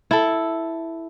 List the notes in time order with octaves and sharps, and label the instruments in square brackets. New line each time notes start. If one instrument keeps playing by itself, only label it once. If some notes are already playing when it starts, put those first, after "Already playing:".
[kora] E4 A4